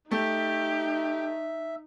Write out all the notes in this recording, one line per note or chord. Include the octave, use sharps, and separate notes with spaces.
A3 D#4 G4 E5